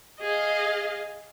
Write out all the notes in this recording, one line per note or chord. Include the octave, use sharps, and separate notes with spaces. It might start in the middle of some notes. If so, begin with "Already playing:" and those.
G#4 D#5 F5